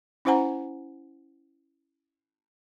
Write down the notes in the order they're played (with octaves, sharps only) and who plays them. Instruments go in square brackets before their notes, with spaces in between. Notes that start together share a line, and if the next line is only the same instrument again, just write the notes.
[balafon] C#4 E4 C5 F#5 G#5 A#5